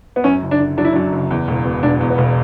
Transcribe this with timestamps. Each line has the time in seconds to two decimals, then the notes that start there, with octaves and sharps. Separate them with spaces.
0.16 B3
0.24 F#2 C#4
0.42 F#1
0.51 D4
0.60 D3
0.78 F#3 D4
0.85 E4
0.93 F#2 D4
1.12 F#1
1.31 E2
1.48 E1
1.65 B2
1.83 E1 D4
2.01 E2
2.10 B3
2.18 E1